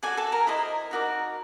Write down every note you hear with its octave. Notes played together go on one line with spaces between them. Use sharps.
F#4 G#4 A4 D5 G#5
A4 A5
A#4 A#5
E4 G#4 C5 D#5
D#4 F#4 A#4 D5